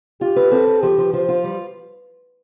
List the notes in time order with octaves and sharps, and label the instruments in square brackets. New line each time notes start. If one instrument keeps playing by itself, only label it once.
[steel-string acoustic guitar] F4 [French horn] G4
[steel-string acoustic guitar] B4
[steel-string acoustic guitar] C4 [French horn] A4
[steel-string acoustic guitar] B4
[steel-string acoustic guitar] F3 [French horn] G4
[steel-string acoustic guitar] F3
[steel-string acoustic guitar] F3 [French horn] C5
[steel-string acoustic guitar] F4
G3